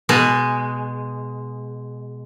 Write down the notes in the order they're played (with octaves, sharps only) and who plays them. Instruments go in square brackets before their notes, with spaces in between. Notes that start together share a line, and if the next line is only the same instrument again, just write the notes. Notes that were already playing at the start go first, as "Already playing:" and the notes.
[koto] B2 G#3